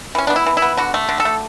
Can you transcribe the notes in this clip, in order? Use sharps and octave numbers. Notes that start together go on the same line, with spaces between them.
E3 C#4
B3 D4
E4
E3
E4
B3
D3 F#4
A3
D3
A4
A3